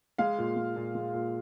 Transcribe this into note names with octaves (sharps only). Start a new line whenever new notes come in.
G#3 F5
A#2
G#3
A#2
G#3
A#2